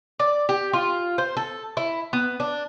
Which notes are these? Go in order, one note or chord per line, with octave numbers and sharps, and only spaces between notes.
D5
G4
F4
C5
A4
E4
B3
D4